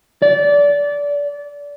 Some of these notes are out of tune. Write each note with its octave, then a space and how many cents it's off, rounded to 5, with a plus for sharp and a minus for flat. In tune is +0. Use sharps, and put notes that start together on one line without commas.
D5 -25